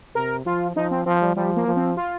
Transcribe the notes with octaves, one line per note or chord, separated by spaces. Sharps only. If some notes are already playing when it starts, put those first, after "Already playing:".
C3 A#4
F3 F4
F3 D#4
C4
F3 C4
G3
F3 G3
A#3
F3
C4
F4